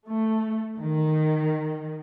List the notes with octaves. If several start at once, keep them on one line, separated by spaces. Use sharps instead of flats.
A3
D#3